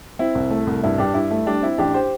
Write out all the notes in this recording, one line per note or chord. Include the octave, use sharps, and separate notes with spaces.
C4 E4
C2
A3
C2
G2 E4
G2 D4 G4
G2 E4
A3
G3 D4
C4 E4
A1 D4 G4
G4 C5